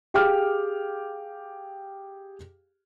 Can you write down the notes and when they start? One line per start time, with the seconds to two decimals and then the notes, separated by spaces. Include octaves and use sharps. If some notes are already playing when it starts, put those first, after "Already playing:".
0.14 G4 G#4 F5 G5 D6 F6